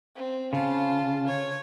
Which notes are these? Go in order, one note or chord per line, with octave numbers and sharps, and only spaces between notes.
C4
C#3 F4 A5
C#5